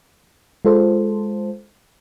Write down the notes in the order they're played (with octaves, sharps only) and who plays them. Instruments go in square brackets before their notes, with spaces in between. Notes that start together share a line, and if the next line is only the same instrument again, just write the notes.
[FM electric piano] G#3 F4 A4 C5